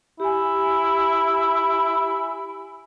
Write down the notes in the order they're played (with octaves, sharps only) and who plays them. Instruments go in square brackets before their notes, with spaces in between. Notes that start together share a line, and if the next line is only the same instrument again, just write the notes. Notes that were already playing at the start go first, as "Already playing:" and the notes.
[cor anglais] E4 [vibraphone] G4 G#5